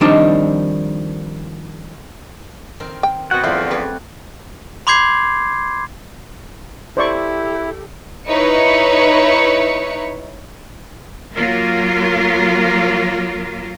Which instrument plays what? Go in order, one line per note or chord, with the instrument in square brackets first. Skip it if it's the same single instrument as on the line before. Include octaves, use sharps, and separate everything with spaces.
[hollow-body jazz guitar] D#3 F3 G3 C4 D4 D#4
[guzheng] D#3 C4 A#4
[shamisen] G5
[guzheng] B2 [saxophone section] B3 F#4 [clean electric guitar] C4 F#5
[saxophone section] E2 D3 F3 [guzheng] G3 A3 F4 [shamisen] E4
[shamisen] C#3 B4 [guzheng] C#5 D5
[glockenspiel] B5 C6 D6 G6 G#6 C7
[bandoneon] E4 [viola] G4 A4 [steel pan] C5 D5 C#6
[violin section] D#4 E4 B4 C#5 C#7
[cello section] F#3 A#3 F4 A#4